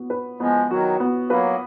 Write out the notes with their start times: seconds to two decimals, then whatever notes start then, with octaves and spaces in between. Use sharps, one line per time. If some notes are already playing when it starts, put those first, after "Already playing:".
Already playing: B3 F#4
0.10 B4
0.40 F3 G#3 B3
0.70 D#3 F#3 F#4
1.00 B3
1.30 F#3 A#3 B4